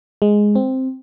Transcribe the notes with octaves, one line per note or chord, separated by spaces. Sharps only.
G#3
C4